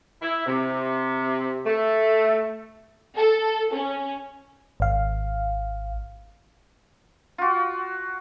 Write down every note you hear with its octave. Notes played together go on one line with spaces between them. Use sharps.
E4
C3
A3
A4
C#4
G#1 F5
F4 F#4